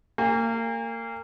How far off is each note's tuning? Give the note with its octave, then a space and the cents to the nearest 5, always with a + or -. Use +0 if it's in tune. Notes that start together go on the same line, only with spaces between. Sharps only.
A#3 -30 G#5 -40